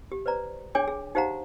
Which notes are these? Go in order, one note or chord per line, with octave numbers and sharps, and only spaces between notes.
G4
B4 C5 D5 A#5
D4 G#4 C#5 G5 G#5 D6
G#4
D#4 G4 C5 F5 F#5 A#5